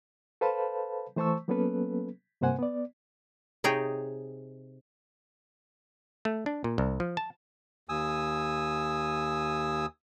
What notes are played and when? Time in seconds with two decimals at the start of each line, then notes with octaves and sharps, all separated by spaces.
0.41 A4 B4 C5 F5 A5 B5
1.16 E3 A3 C5 A5 C#6 E6
1.48 F#3 A#3 B3 C#4 A4 B4
2.41 G2 C3 A#3 C5 F#5 G#5
2.59 B3 D5
3.64 C3 D#4 G#4 C#5 G5
6.25 A3
6.46 D4
6.64 A#2
6.78 C2
7.00 F3
7.17 A5
7.89 D#2 G#5 D#6 E6